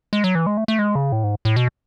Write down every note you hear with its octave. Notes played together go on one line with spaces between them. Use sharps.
G#3
F#3
E3
G#3
A3
A3
G#3
C#3
A2
G#2
A2
B2